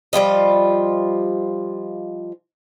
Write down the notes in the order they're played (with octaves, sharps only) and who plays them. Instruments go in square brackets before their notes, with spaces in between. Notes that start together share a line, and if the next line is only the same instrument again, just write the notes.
[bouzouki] F3 G3 F4 D#5